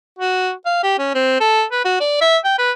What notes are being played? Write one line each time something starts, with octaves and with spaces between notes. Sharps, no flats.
F#4
F5
G4
C#4
C4
A4
B4
F#4
D5
E5
G5
B4